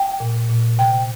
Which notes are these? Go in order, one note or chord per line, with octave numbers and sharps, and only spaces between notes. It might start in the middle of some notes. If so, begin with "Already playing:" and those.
Already playing: G5
A#2
A#2
C3 G5